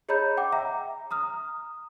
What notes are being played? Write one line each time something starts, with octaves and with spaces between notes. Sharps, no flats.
G#4 C#5 D#5 A#5 B5 G6
F#5 G5 D6
E5 A#5
A#5 D#6 F6